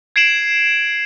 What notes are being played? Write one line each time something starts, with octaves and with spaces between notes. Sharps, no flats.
G#6 C7 D7 E7 F#7